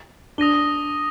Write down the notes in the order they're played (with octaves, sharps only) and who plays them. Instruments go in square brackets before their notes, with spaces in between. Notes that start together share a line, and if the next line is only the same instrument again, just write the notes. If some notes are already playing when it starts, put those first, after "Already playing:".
[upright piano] D4 [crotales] D#6 A#6 D#7 G7